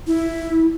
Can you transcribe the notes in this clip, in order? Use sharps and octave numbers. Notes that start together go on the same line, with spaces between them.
E4